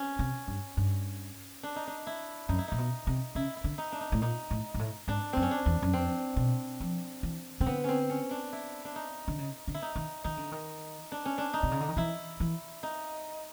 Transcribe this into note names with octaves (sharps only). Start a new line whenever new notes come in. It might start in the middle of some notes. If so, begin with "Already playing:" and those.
Already playing: C#4
C3
G2
G2
D4
D#4
D4
E4
F#2 D#4
E4
A#2 D#4
B2
C3
C#3 E4
E4
D3
D#4
D4
D#4
A2
A#2 D#4
A2
G#2
A2
G#2 D4
F#2 C4
C#4
D4
E2
F#2
F2 C4
B2
F3
E3
C#3 C4
D3 B3
C4 C#4
C#4
D4
E4
D4
D#4
D3
C#3
D3
E4
D#4
D#3
D#3 D#4
D3
D#3
D4
C#4
D4
D#4
C3
C#3
D3
D#3
E3 E4
E3
D#4